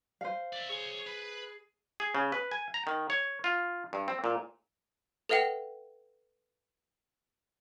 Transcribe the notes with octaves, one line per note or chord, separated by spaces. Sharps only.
C5 F5
D5 E5
G#4 C#5 C6
B4
G#4
C#3
B4
G#5
A#5
D#3
C#5
F4
G2
C4
A#2
A4 B4 E5 F#5 G5